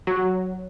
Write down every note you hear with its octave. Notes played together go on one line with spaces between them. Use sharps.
F#3